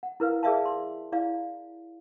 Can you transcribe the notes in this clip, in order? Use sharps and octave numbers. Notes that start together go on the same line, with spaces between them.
F#5
E4 A#4 B4 F5
G#4 A#4 D5 E5 F5 A5
C6
E4 D5 F5